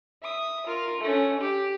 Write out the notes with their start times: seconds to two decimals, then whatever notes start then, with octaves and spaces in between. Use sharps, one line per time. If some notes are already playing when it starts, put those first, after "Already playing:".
0.22 E5 D#6
0.66 F4 A#4
1.01 A3 C#4
1.41 G4